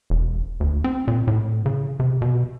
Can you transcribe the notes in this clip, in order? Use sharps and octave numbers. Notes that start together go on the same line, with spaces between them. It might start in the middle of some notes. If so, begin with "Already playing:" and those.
E1
D2
C4
A#2
A2
C#3
C3
B2